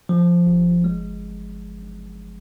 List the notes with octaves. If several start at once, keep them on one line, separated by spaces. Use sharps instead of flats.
F3
G1
G#3